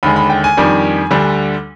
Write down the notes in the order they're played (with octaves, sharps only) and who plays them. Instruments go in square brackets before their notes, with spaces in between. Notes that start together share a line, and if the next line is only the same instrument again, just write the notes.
[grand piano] D#2 D3 G#3 B5
B5
G5
G#5
F2 D#3 G3 D4
D2 D3 G3 D4